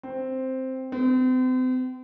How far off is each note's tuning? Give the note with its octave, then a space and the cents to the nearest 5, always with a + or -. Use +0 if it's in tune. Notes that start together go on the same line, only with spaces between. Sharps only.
C4 +0
C4 -40